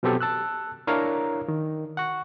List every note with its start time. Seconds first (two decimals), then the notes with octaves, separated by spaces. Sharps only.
0.03 B2 F#3 B3 C4 G4 A4
0.21 A5 E6 F#6
0.87 D4 E4 A#4 C#5 F5 A#5
1.48 D#3
1.97 F#5 C#6